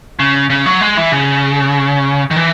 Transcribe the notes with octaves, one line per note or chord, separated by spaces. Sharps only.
C#3
C#3
F#3
G#3
E3
C#3
D#3
E3